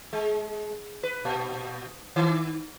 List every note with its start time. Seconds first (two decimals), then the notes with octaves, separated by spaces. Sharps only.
0.13 G#3
1.03 B4
1.25 A#2
2.16 D#3